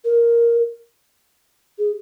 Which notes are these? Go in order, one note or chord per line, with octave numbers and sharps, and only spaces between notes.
A#4
G#4